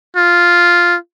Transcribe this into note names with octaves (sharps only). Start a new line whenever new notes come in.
F4